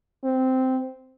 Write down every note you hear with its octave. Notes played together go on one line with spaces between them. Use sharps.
C4